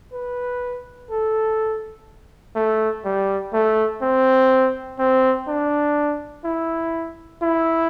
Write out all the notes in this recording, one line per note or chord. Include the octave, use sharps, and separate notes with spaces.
B4
A4
A3
G3
A3
C4
C4
D4
E4
E4